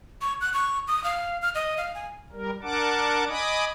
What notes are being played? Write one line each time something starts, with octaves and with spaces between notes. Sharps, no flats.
C#6
F#6
C#6
D#6
F5
F6
D#5
F5
G#5
G3 A#4
D4 A#4 F#5 A5 D6
D#5 G#5 B5 D6 D#6